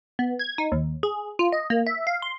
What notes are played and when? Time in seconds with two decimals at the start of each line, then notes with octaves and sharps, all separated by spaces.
0.19 B3
0.39 G#6
0.58 D#4
0.72 D#2
1.03 G#4
1.39 F4
1.52 D#5
1.70 A#3
1.87 E5
2.07 F5
2.22 C6